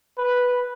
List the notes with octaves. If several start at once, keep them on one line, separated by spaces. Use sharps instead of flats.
B4